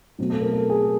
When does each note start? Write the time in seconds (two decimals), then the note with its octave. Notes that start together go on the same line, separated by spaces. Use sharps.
0.18 B2 F#3 A3 C4
0.30 A4
0.42 A#4
0.52 A4
0.70 G#4